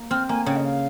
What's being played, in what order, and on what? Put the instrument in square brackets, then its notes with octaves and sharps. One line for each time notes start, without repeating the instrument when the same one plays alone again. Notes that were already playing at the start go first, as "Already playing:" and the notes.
Already playing: [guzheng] A#3
[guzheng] C4 [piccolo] F6
[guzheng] A#3 [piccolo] G#5
[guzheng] C#3 [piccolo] G5
[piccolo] D#5
F5